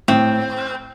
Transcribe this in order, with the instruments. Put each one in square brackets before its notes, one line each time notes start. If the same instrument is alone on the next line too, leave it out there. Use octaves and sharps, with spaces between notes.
[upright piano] A2 [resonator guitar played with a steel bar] C4